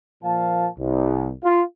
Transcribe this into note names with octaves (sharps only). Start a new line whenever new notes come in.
A#2 F3 F5 A5
C2
F4